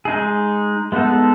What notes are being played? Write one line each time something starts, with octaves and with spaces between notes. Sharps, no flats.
G#3 D#4 G#4
G#3 B3 D#4 A4